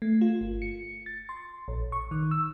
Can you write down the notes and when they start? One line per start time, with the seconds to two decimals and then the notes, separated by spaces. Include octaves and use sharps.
0.02 A3
0.21 F4
0.41 G1
0.62 C#7
1.06 A6
1.29 C6
1.68 A#1
1.92 C#6
2.11 D#3
2.31 E6